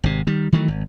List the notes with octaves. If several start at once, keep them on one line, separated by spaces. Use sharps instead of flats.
G#1 C3
D#3 G3
D#3 E3 F#3 A3
G#1